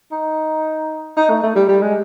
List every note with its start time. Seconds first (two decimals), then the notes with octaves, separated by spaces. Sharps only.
0.12 D#4
1.17 D#4
1.30 A3
1.43 A3
1.56 G3
1.69 G3
1.82 G#3